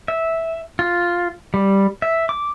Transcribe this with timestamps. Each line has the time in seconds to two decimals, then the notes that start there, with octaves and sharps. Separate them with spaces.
0.08 E5
0.79 F4
1.54 G3
2.02 E5
2.29 D6